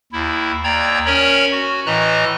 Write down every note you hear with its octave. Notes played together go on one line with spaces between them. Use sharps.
D#2 E4
D#2 D5 G5 A#5 G#6
C#4 A#4 C#5 B5
F#4
A2 E3 D#5 A#5 F#6